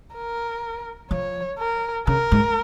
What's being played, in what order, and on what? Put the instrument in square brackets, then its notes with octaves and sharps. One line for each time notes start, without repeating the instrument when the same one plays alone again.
[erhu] A#4
[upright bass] F3 [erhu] C#5
[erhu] A#4
[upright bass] C#3 [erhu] A#4
[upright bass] G#2